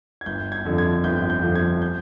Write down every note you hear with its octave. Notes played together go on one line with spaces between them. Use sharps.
G#6
G1 G6
G#6
F2 D3 F3
G#6
G1 G6
G6
F2 D3 F3
G#6
G6